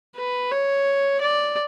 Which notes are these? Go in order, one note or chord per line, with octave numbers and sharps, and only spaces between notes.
B4
C#5
D5